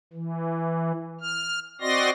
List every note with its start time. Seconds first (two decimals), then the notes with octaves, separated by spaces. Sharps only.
0.13 E3
1.21 F6
1.81 C4 F#4 D5 D#5 C6 A#6